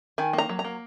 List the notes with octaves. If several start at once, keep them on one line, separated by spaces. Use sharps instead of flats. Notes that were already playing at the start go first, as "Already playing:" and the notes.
D#3 G#5
A#3
A#5
F#3
A#5
A#3